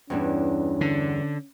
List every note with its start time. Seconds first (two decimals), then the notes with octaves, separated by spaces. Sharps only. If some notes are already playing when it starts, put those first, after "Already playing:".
0.10 E2 G2 C#4 D4
0.81 D3